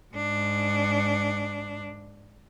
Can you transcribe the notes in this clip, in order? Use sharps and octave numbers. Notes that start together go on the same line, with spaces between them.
G#2 D4